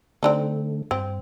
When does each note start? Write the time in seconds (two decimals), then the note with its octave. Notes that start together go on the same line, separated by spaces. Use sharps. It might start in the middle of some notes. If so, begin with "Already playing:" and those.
0.23 D3 A3 C4 D4 D#4
0.91 G2 C4